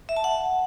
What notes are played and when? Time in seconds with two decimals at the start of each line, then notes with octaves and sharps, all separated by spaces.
0.09 E5
0.16 A5
0.24 F#5